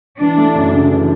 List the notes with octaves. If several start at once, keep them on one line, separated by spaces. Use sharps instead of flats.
E3 D4
A3
F#2
C#3
E3